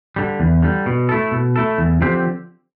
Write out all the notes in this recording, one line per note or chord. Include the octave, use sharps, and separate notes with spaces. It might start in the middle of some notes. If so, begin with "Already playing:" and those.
D3 G3
E2
D3 G3
B2
A3 E4 A4
B2
A3 E4 A4
E2
D3 F3 C4 G4